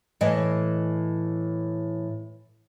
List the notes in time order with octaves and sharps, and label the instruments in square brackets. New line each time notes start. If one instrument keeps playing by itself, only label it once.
[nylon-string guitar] A2 E3 D#5